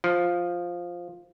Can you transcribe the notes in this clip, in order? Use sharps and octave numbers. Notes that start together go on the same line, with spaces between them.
F3